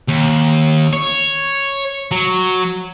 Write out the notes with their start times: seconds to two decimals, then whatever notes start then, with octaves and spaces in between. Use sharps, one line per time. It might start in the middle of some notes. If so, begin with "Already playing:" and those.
0.08 D#2
0.93 C#5
2.12 F#3